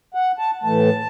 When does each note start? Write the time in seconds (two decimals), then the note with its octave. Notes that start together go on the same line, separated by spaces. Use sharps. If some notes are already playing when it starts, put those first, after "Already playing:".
0.14 F#5
0.38 A5
0.63 A2 E3 A3 A5